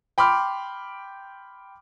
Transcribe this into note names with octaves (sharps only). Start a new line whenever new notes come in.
G5 B5 C6 D6 F6